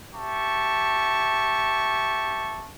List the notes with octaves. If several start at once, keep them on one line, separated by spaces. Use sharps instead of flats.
G4 E5 A5 C#6